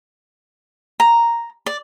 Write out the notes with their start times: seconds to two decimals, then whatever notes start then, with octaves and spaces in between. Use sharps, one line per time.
1.00 A#5
1.66 D5